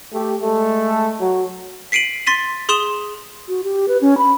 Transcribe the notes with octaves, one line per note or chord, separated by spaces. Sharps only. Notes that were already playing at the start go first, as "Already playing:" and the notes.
A3 G4
G#3 A3 A4
F#3
B6 C7 D7 D#7 F#7
C6 A6 B6 D#7
G#4 C6 D#6 E7 G7
F#4
G4
B4
C#4
B5